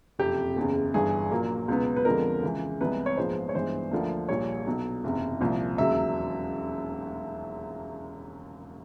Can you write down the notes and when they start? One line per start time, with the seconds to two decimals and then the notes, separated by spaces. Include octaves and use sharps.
0.19 F#1 F2 C3 G4
0.56 F#1 E2 C#3
0.94 G1 G2 E3 G#4
1.31 A#1 A#2 F#3 A#3
1.68 C#2 B2 F#3 B3
1.96 B4
2.05 F2 D3 F3 G#3 B3 A#4
2.43 C#2 C#3 E3
2.81 C2 C3 E3 G#3 B3 B4
3.06 C#5
3.17 A#1 G#2 F3 G#3 B3 C5
3.49 C#5
3.54 G2 E3 G#3 B3 C5
3.91 D2 D3 F3 A#3
4.29 A#1 A#2 G3 C#5
4.67 B1 B2 F#3
5.04 F#1 E2 C3
5.40 C2 A#2 F3
5.78 E1 D#2 C#3 F#3 E5